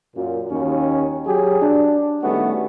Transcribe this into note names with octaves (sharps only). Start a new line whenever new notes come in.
F#2 A#2
D#2 C#4
F#3 G4 G#4
D4
D#3 G3 A3 B3 C#4 F#4